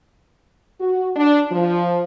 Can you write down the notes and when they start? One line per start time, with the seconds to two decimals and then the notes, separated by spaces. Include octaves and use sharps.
0.80 F#4
1.16 D4
1.51 F3